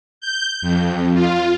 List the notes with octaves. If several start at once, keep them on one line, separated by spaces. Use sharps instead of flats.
G6
F2
F4